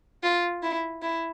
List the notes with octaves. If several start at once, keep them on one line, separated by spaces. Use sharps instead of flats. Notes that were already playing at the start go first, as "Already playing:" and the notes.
F4
E4
E4